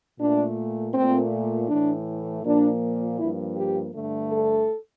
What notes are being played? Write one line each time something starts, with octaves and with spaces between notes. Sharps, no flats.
A#2 A3 D4
A#2 A3 C4
A2 E3 A3 D4
A#2 F3 A#3 D4
G2 F3 A#3 E4
G4
G2 D3 A3
A4